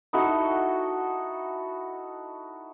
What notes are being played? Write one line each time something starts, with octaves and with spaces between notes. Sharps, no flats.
D#4 E4 F#4 A4